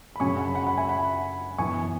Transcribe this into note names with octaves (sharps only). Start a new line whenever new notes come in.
B5
F#2 C#3 F#3 C#4 G#5 C#6
F#5 B5
F#5 B5
F#5 B5
E5 G#5
F#5 B5
F#2 E3 B3 G#5 C#6